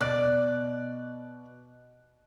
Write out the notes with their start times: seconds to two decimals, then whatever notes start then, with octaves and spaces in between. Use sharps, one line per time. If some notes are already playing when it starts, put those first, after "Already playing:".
0.01 B2 D5 F#6 D7